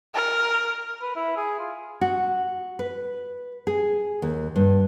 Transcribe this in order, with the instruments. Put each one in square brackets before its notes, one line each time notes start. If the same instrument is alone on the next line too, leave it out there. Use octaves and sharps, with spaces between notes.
[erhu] A#4
[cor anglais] B4
E4
G#4
F4
[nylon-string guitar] F#4
B4
G#4
D#2
G2